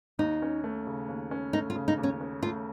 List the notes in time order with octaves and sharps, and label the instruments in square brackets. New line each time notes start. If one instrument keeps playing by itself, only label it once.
[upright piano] D#2 [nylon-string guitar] D#4
[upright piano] C#4
A3
C#3
D#2
C#4
[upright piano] A3 [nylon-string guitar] D#4
[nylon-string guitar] F4
[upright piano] C#3
[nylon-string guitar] D#4
[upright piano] D#2
[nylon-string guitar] C#4
[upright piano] C#4
[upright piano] A3 [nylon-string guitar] F4